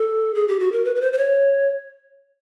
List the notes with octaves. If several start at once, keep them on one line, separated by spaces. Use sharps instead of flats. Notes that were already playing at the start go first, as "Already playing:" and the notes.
Already playing: A4
G#4
G4
F#4
A#4
B4
B4
C5
C5
C#5